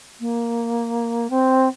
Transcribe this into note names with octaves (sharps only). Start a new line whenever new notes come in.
A#3
C4